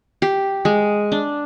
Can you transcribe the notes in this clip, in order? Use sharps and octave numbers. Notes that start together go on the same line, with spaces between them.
G4
G#3
D4